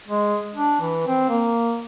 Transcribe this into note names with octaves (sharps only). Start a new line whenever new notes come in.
G#3
D4
E3
C4
A#3